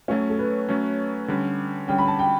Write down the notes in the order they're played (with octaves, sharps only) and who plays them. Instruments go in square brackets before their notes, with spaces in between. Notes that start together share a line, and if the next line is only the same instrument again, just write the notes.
[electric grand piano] F#3 A3 C#4 [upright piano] C#5
[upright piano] A4
B4
[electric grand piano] F#3 A3 C#4
D3 G3 C#4
[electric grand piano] D3 G3 C#4 [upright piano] G5
[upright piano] B5
A5
G5